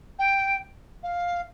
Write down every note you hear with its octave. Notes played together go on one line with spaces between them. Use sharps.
G5
F5